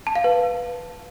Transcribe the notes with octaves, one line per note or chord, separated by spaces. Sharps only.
A5
F5
B4